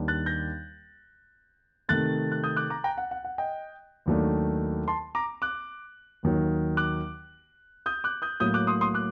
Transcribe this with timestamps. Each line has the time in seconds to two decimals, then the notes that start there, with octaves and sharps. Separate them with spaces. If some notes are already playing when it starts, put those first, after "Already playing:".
Already playing: D#2 D#3 G3 D4
0.08 F#6 A6
0.26 G6 A#6
1.89 C3 D#3 A3 F#6 A6
2.32 F#6
2.44 D#6 G6
2.56 D6 F#6
2.70 A#5 D6
2.84 G5 A#5
2.98 F#5
3.11 F#5
3.25 F#5
3.38 D#5 G5
4.06 D#2 D#3 F#3 A3 D4
4.88 A5 C6
5.15 A#5 D6
5.42 D6 F#6
6.23 D#2 D#3 F#3
6.77 D6 F#6
7.86 D#6 G6
8.04 D6 F#6
8.22 D#6 G6
8.40 A2 F#3 A#3 D#6 G6
8.54 D6 F#6
8.67 C6 D#6
8.81 C6 D#6
8.94 D6 F#6